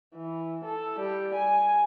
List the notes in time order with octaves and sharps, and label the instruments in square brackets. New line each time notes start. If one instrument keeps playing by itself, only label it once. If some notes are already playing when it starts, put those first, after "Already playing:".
[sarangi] E3
A4
G3
G#5